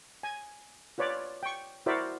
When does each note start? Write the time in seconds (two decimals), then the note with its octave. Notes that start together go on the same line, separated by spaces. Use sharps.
0.23 G#5
0.98 F4 B4 C#5 D5
1.43 G5 C#6
1.86 E4 F#4 A#4 C5 D5 E5